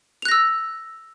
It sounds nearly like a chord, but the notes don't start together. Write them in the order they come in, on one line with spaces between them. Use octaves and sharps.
F7 F#6 A#6 E6